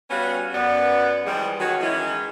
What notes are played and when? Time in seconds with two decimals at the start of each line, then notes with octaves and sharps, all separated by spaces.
0.10 G3 B3 C#4 F#4 C#5 F5
0.54 F#2 B3 D5
1.25 E3 F3 G3 G#3
1.60 D#3 F#3 C#4 F#4
1.81 D#3 E3 G#3 C#4 E4